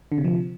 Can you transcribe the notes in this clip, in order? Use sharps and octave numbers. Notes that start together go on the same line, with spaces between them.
D3
C3
F3